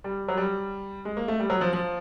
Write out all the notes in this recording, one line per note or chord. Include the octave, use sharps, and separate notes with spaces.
G3
F#3
G3
G#3
A#3
A3
G3
F#3
F3
F3